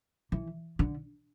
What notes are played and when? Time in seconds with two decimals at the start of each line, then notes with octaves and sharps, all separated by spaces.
0.32 E3
0.79 D3